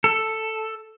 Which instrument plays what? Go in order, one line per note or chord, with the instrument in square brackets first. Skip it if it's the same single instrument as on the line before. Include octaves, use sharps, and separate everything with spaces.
[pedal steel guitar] A4